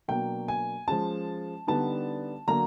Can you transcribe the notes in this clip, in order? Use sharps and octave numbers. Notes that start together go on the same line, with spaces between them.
B2 F#3 A#3 D4 G5
G#5
F3 G#3 C#4 A5
D3 G3 B3 D#4 A5
D3 F#3 A#3 A#5